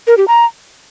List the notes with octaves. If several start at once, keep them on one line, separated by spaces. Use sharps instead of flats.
A#4
G4
A#5